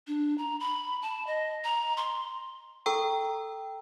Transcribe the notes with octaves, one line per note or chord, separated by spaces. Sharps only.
D4
A#5
B5
A5
D#5
A#5
C6
A4 G5 A#5 C#6 E6